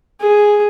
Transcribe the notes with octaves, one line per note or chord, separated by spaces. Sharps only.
G#4